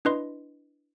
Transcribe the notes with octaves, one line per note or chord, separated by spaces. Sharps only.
D4 E4 B4 D#5 C6